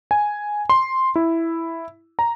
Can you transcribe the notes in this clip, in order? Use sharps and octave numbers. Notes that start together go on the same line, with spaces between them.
G#5
C6
E4
A#5